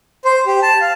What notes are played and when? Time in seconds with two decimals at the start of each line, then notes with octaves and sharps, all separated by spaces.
0.25 C5
0.47 G4
0.63 A5
0.81 F5